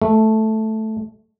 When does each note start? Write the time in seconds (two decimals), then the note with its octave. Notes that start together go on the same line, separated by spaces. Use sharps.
0.02 A3